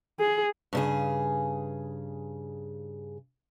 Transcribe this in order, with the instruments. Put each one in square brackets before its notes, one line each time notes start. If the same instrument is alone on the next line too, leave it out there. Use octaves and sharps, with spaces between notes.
[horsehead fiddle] G#4
[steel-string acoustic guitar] G2 C#3 G#4